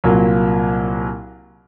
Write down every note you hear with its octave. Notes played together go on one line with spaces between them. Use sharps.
C2 A#2 F#3 A#3